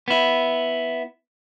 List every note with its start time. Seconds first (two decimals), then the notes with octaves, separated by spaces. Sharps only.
0.08 B3 E4